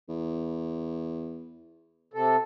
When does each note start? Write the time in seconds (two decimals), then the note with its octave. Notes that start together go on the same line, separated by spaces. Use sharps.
0.09 E2
2.14 C3 A4